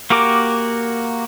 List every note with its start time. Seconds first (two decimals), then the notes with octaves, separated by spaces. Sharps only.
0.10 A#3 F#4 G4 A#4 D6